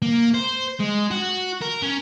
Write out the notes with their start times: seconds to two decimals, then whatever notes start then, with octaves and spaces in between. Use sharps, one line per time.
0.02 A#3
0.34 C5
0.79 G#3
1.11 F#4
1.62 A#4
1.82 C#4